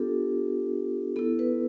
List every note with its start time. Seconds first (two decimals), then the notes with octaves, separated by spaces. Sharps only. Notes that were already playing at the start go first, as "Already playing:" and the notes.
Already playing: B3 D4 F4 G4 A4
1.16 B3 E4 A4
1.39 B4